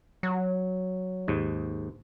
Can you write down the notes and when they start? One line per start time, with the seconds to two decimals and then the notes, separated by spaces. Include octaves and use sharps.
0.23 F#3
1.28 D#2 G#2